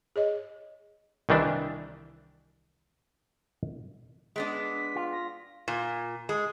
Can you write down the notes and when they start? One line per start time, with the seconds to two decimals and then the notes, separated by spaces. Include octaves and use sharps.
0.16 G#4 C#5 D#5
1.29 C2 D#3 E3 D4 D5 E5
4.36 G#3 B3 D4 B6
4.96 F4
5.12 A#6
5.68 A#2
6.29 G#3